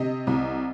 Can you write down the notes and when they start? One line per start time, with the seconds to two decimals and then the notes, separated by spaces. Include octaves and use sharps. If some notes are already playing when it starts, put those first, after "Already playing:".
Already playing: C3 D#5
0.27 C2